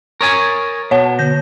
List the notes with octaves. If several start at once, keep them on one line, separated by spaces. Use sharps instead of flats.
A#4 C#5 G#5 C#6 D#6 A6
B2 C#5 F#5 A5
D3 G6 A#6